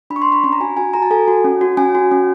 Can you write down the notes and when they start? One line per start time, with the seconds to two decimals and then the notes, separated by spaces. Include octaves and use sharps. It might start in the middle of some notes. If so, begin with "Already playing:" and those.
0.10 D4 B5
0.16 C#6
0.22 C6
0.27 D4
0.32 B5
0.44 C#4 B5
0.52 A#5
0.60 F#4 G#5
0.77 F#4 G#5
0.94 F#4 A#5
1.02 A5
1.11 A4 G#5
1.28 F#4
1.44 C#4
1.61 F#4
1.77 C#4 G#5
1.95 F#4
2.11 C#4